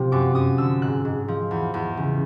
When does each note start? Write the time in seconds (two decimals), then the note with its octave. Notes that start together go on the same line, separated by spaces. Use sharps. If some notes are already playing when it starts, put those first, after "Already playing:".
Already playing: C3 F3
0.12 F#2 D6
0.35 F#2 D#6
0.58 D3 E6
0.82 G#2 F#6
1.05 G#2
1.28 F3
1.51 E2
1.74 E2
1.97 C#3